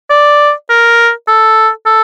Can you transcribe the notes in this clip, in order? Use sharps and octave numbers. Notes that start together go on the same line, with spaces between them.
D5
A#4
A4
A4